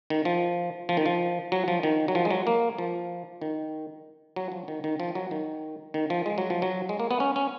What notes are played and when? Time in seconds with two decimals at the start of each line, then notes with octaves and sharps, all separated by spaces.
0.10 D#3
0.25 F3
0.89 F3
0.97 D#3
1.06 F3
1.52 F#3
1.68 F3
1.83 D#3
2.08 F#3
2.15 F3
2.25 G#3
2.31 F#3
2.47 A#3
2.78 F3
3.42 D#3
4.36 F#3
4.52 F3
4.68 D#3
4.84 D#3
5.00 F3
5.15 F#3
5.31 D#3
5.94 D#3
6.10 F3
6.26 G#3
6.38 F#3
6.50 F3
6.62 F#3
6.89 G#3
7.00 A#3
7.11 B3
7.20 C#4
7.36 C#4